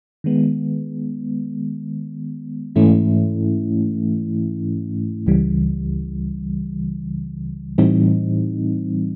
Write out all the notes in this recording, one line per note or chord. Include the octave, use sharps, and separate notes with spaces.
D#3 G#3 B3
G#2 E3 A3 C#4 E4
C#2 C#3 E3 G3
A2 E3 G3 C4 D#4